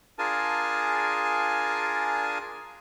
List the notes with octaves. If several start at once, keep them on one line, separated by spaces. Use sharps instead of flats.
D4 F4 G#4 A#4 G#5 A5